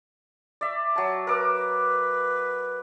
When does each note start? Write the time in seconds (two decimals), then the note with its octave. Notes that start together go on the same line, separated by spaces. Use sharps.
0.61 D5 E5
0.96 F#3 A5
1.27 A#4 B4 D6 E6